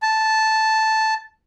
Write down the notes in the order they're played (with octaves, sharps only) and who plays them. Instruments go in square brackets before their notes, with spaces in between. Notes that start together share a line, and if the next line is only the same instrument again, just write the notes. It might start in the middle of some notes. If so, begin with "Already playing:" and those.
[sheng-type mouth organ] A5